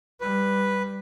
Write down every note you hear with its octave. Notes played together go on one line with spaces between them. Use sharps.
G3 B4